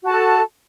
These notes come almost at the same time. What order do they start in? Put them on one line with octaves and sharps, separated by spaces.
F#4 A5 A4